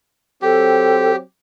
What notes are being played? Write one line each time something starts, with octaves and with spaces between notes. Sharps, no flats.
F#3 C4 G4 A4